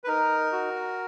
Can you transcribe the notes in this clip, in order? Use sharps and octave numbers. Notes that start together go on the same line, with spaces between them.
B4
D#4 A#4
F#4